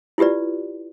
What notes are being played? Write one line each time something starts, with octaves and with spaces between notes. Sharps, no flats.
E4 F4 G4 B4 D5